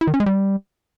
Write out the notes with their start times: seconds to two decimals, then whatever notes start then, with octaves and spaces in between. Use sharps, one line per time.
0.01 E4
0.07 D#3
0.14 C#4
0.20 G#3
0.26 G3